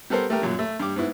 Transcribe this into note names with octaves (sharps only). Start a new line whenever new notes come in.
G3 B3 A4 A#4 C5
A3 G4 A#4
F#2 A#2 F#3
A3
G2 G4 D6
G#2 B3 E4